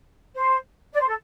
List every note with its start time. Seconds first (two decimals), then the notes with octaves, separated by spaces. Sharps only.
0.36 C5
0.94 D5
1.00 C5
1.07 A4